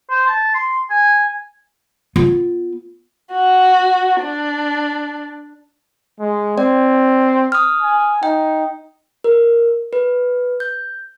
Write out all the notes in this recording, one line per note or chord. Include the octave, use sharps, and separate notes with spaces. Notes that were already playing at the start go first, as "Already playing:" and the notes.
C5
A5
C6
G#5
B3 F4
F#4
D4
G#3
C4 D5
D#6 F6
G#5
D#4 G5
A#4
B4
G6